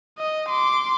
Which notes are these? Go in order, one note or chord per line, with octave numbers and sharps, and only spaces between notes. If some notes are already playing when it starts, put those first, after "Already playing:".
D#5
C6 D6